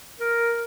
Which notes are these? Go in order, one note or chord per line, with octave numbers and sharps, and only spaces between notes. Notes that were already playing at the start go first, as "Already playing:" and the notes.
A#4